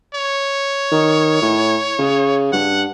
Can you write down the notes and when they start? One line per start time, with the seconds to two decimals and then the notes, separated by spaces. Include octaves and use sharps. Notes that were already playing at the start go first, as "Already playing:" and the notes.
0.14 C#5
0.92 D#3
1.42 A2
1.99 C#3
2.53 G2 F#5